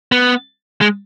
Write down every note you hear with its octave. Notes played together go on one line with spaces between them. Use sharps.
B3
G#3